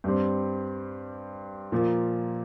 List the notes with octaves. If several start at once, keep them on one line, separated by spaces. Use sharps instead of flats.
G2 G3 C4
A#2 F3 A#3